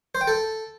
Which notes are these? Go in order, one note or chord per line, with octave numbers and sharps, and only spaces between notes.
C5
G5
A4